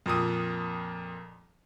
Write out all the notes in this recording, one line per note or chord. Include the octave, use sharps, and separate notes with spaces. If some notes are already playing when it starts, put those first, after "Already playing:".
F2 A#2 D#6